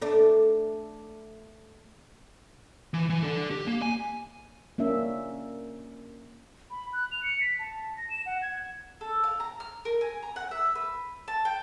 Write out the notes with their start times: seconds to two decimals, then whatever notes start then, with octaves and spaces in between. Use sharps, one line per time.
0.02 A3 D4
2.94 E3
3.10 E3
3.23 D4 A4
3.51 G4
3.67 A#3
3.82 G#5
4.78 A#3 C#4 D4 E5
6.71 B5
6.93 F#6
7.12 F7
7.23 C#7
7.41 B6
7.59 A5
7.97 A#6
8.10 E7
8.26 F#5
8.42 G#6
9.01 A4
9.24 F5
9.40 A#5
9.60 F6
9.85 A#4
10.01 G#5
10.23 A#5
10.36 F#5
10.51 E5
10.75 B4
11.28 A5
11.45 G5